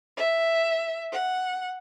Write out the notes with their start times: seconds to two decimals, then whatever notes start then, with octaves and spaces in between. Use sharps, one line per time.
0.18 E5
1.13 F#5